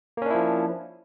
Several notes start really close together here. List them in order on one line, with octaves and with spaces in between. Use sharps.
A#3 C#4 D4 E4 F3